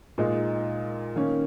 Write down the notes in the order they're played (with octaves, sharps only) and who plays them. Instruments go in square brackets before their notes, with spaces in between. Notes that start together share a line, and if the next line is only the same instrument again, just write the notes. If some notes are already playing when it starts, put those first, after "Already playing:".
[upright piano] A#2 G#3 D#4
D#3 A#3 C#4